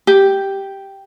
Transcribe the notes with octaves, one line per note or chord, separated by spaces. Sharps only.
G4